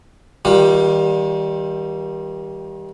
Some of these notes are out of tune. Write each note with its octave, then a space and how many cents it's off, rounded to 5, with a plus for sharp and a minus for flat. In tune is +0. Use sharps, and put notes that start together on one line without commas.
D#3 +30 G3 +0 F4 +35